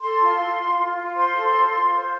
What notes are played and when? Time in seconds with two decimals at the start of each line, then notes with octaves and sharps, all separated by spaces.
0.01 A4 C6
0.21 F4
0.40 F4
0.59 F4
0.78 F4
0.96 F4
1.16 C5 C6
1.36 A4
1.54 F4
1.73 F4
1.92 C5